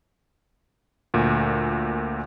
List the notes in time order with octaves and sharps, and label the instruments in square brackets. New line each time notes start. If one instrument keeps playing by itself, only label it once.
[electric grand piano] D2 A#2